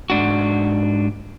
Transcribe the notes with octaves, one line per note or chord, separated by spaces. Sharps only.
G#2 D4 F#4